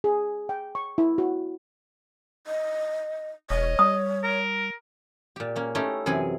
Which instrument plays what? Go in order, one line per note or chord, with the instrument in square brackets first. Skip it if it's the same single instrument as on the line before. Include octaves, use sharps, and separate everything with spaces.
[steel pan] G#4
G5
C#6
E4
F#4
[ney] D#5
[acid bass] E1 [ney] C#5 [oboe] D#5
[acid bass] G3 [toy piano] D#6
[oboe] A#4
[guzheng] A#2 G4
A#3 C#4
A3 C#4 D#4 E4 G4
F#2 C3 E3 G#4 G#5 B5